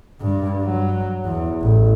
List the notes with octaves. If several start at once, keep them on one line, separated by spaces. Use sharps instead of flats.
G2
F#3
E2
A1